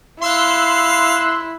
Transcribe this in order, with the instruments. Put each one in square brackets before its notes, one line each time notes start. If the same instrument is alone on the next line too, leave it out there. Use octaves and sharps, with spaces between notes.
[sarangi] E4 [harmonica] F5 [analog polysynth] C6 E6 F#6